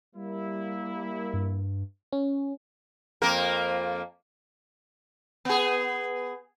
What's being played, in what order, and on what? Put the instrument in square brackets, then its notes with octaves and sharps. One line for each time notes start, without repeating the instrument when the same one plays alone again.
[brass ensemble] G3 A#3 E4
[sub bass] G2
[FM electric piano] C#4
[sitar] F2 A#3 A#4
B3 G#4